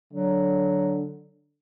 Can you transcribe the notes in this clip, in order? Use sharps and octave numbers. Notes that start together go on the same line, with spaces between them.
D3 F#3